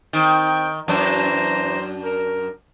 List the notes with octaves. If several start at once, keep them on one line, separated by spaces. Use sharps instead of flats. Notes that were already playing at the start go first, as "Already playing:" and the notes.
D#3 C4 G5
F#2 E3 D4 C5 A#5
A#4